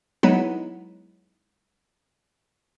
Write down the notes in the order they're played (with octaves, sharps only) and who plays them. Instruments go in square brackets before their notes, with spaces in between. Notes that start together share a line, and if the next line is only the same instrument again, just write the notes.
[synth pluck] F#3 G#3 B3 D#4 E4